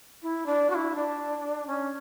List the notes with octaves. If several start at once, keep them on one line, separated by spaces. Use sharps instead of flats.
E4
D4
F#4
E4
D4
C#4